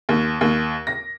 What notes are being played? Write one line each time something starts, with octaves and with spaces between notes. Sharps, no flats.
D#2
D#2
A#6